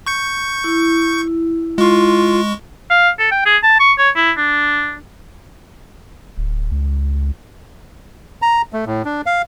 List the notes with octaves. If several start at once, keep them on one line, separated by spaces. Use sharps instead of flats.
C#6 G6 C#7
E4
G#3 F4 C#6
F5
A4
G5
G#4
A5
C#6
C#5
E4
D4
D1
C#2
A#5
A3
A2
D4
F5